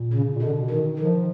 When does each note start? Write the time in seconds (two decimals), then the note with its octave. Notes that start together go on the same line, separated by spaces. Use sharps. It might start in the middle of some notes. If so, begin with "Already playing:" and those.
Already playing: A#2
0.13 C#3
0.36 A#2
0.42 B2 D3
0.70 D#3
0.98 D#3 F3